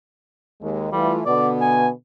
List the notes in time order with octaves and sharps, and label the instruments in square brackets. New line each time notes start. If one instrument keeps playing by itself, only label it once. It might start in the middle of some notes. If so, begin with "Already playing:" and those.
[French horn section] D#2 G#3
[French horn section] E3 A3 F4 [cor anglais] G3
[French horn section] B2 D3 B3 [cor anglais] D5
[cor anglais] G#5